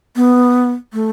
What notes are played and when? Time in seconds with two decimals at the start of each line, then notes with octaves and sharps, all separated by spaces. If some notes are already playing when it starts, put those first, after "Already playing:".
0.16 B3
0.93 A3